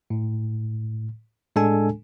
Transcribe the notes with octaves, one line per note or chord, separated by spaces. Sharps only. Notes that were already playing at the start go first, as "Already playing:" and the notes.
A2
A2 G#3 D4 A4 G#5